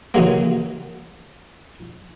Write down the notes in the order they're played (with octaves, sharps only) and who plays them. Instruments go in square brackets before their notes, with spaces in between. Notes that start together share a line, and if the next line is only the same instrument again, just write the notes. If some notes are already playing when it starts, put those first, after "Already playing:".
[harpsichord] C#3 E3 F#3 G#3 A#3